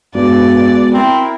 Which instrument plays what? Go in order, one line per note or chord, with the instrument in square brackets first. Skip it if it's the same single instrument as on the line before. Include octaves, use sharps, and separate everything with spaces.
[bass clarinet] G2 [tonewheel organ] G#3 B3 F#4 [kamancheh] D5
[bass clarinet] C4 [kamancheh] E4 A#4